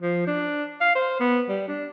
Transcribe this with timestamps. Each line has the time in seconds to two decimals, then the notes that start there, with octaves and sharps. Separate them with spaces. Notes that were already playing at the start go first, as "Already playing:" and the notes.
0.02 F3
0.27 D4
0.81 F5
0.95 C5
1.20 B3
1.49 G3
1.68 D4